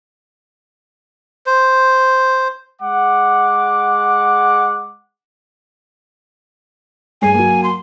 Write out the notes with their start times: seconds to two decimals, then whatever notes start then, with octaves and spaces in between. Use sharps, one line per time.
1.46 C5
2.82 G#3 F#5 D6
7.22 G2 G#4 G#5 C7
7.34 F#3 A#3
7.64 C6